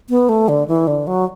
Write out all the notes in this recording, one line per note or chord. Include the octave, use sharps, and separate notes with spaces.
B3
A3
D3
E3
D3
F#3